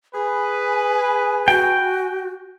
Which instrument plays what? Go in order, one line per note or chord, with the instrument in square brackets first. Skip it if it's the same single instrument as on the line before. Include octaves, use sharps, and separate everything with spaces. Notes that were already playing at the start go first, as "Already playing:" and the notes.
[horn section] G#4 B4 [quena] G#5
[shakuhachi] F#4 [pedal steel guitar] G5